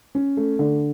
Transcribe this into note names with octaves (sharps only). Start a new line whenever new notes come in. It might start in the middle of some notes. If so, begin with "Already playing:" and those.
C#4
A3
D3